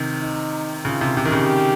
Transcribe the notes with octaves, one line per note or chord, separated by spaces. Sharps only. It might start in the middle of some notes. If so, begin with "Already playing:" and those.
Already playing: C3 D#3
D#4
C#3 F4
C3
C3 G4
D#3
C#3